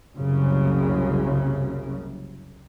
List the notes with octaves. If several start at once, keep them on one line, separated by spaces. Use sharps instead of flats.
F#1 C2 F#2 C#3